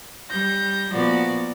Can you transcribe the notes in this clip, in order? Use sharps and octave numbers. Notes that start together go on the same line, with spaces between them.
G3 G6 A#6
A#2 F3 B3 F#4 D5